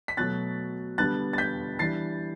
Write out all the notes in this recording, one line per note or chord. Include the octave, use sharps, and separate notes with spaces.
B6
B2 F#3 A3 F#6 A6
D3 G3 B3 D4 F#6 A6
A6
G6 B6
E3 G3 D4 A6 C7